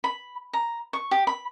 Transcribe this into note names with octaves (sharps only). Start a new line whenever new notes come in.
B5
A#5
C#6
G4
B5